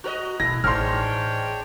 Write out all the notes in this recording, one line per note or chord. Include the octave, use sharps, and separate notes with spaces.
F#4 A#4 D#5 A#5 F#6
D1 B2 E4 A4 A#6
A1 G#2 D4 C#5 G5 C6 F6